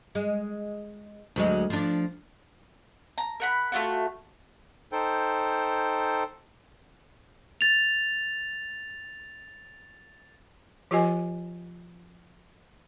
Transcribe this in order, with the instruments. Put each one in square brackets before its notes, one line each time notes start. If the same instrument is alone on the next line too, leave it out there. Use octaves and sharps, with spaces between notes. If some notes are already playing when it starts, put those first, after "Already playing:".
[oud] G#3
D2 F#3 G#3
F3 D4
[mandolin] A#5
A#4 F#5 B5
A3 D4 F4 F#4
[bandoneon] D#4 A4 C5 G5
[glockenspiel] A6 F7
[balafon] F3 F4 G4 B4 D#5 G#5